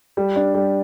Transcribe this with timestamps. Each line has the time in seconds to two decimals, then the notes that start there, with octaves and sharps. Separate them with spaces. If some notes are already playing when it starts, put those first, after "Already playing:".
0.17 G3
0.36 D4
0.54 G3